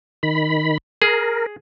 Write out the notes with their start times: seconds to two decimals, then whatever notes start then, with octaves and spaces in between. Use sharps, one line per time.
0.23 D#3 B5
1.02 G#4 A#4